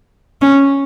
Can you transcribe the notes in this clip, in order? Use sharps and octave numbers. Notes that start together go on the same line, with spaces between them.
C#4